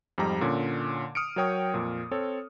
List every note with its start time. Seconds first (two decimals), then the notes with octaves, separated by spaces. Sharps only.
0.18 F2 G#2 F3 G3 A#5 D6
0.41 A#2 D3 C#4
1.15 D#6 F6 C#7 D7
1.36 F#3 A#4 C#5 G5 D#6
1.74 F2 A#2
2.11 C4 A4 C#5